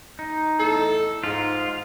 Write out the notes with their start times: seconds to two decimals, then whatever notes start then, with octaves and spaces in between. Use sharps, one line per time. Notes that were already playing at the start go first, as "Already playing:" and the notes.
0.19 D#4
0.59 E2 A2 A4
1.24 G#2 F4